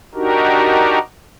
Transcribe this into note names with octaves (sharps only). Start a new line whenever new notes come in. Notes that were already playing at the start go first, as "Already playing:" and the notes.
D4 D#4 F#4 G4 A#4